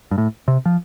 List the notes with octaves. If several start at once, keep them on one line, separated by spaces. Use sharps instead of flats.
G2
A2
C3
F3